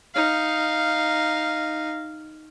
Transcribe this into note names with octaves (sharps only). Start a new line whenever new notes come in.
D#4 F5